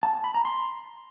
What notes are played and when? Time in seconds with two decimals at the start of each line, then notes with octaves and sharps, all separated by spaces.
0.03 A5
0.13 A5
0.24 B5
0.34 A#5
0.45 C6